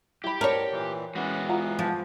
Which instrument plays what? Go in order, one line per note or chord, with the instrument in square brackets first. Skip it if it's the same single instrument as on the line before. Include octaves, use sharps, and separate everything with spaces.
[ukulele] E4 B5 [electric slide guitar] G4
[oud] A#4 C#5 [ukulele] D5 A5 A#5
[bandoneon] A#2 E3
[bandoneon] E3 B3 [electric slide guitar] G#3 F#4 [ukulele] C#4
[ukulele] F4 F#5 A#5
[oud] F3